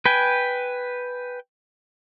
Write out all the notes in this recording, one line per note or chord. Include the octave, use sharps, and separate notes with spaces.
B4 G5 G#5